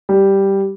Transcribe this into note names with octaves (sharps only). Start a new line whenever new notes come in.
G3